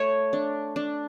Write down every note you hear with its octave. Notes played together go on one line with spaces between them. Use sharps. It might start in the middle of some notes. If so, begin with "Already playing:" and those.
Already playing: A3 C#5
D4
D4